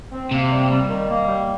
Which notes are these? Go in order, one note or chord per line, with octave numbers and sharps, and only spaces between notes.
C4
C3 A#3
G3
G3
D#3
A#3
G3